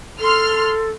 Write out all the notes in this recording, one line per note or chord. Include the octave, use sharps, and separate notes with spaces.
A4 C6 F6